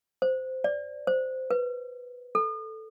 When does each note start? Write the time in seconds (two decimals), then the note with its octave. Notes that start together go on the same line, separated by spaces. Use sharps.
0.22 C5
0.64 D5
1.07 C5
1.51 B4
2.35 A4